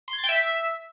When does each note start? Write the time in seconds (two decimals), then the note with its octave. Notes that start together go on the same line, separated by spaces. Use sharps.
0.08 C6
0.13 G#6
0.18 A6
0.24 G5
0.29 E5